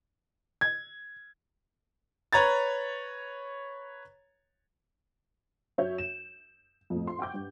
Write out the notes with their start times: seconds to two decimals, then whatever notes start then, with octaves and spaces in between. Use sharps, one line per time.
0.61 G#6
2.33 B4 C#5 A#5 G#6 A6
5.78 F#2 C#5 E5 G6
5.98 E7
6.90 F2 A2
7.07 C6
7.19 F#5 G5 C#6 D6 G6
7.34 G2